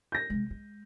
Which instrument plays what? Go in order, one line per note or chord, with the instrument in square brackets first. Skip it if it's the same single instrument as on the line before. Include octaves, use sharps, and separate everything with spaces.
[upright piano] G6 A#6
[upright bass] C3 G#3
G#3